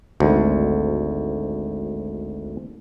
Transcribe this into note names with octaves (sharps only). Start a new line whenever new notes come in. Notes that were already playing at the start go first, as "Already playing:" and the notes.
G#1 D2